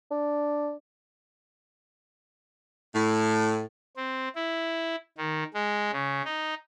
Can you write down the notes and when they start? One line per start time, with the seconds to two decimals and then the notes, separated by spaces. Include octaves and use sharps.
0.11 D4
2.95 A2
3.97 C4
4.35 E4
5.17 D#3
5.54 G#3
5.92 C#3
6.25 D#4